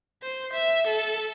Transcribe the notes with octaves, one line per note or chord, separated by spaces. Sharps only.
C5
E5
A4